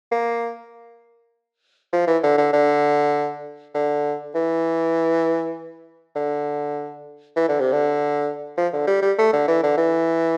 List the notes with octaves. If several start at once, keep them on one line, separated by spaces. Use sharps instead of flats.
A#3
F3
E3
D3
D3
D3
D3
E3
D3
E3
D3
C3
D3
F3
D3
G3
G3
A3
D3
E3
D3
E3